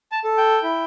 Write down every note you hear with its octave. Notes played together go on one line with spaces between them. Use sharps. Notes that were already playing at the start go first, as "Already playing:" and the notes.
A5
A4
G5
E4